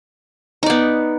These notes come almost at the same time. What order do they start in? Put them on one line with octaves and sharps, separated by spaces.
D#4 D5 B3